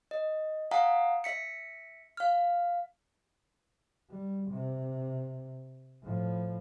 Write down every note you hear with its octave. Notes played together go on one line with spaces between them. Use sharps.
D#5
F5 F#5 G#5 A#5 D#6
E5 B6 C#7
F5 F6
G3
C3
A2 F3